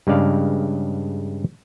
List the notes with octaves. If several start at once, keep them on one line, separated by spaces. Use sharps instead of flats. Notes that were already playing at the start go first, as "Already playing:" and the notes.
G2 C#3 G#3 D5 F5